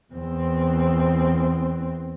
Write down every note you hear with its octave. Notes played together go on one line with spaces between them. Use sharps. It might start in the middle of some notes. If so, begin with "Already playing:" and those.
E2 C4